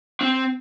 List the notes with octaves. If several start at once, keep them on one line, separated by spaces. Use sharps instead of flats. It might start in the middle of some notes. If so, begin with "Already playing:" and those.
C4